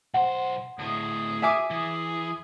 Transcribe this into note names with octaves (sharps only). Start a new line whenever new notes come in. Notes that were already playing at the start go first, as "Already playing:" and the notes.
B1 C5 F#5
D2 A2 G#4
E5 G#5 D6
E3 G#4